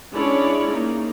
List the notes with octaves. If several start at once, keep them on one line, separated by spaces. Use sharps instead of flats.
G#3 C#4 D4 E4 C#5 D5
A#3 D#4